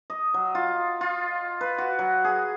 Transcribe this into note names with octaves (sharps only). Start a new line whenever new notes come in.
D#5
F#3
F4
F4
B4
F#4
F#3
G#4